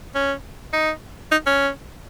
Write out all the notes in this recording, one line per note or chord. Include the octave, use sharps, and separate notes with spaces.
C#4
D#4
D#4
C#4